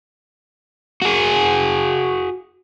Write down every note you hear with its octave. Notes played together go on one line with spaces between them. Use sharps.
F#4 G#4